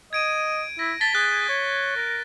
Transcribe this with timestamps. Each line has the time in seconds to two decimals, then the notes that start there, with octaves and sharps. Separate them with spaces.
0.13 D#5 G#6 D7 D#7
0.79 E4 A#6
1.01 A5 A6 B6 G7
1.15 G#4 F#6
1.49 C#5
1.96 A#4